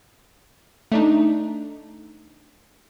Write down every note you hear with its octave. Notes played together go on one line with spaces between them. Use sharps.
A3 D4 D#4